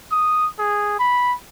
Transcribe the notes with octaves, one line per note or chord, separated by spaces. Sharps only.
D#6
G#4
B5